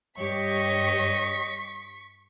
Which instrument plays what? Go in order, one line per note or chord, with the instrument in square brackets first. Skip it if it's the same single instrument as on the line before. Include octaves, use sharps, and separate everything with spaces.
[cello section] G2 G4 C#5 [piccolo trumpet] D#5 [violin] C#6 B6